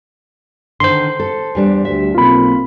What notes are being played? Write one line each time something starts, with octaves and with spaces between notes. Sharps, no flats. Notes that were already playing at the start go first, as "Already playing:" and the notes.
D3 D#3 C5 C6
A4
E2 G3 D4
D2 G3 E5
B1 A#3 C4 F4 B5